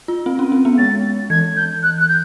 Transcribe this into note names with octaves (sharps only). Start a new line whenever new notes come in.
F4
C4
C#4
C4
B3
G#3 A6
E3 G#6
G6
F#6
F#6
G6